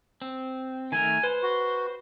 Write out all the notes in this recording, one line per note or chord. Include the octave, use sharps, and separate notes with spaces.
C4
D#3 A3 A#4 G#5
B4 C5
F#4 B4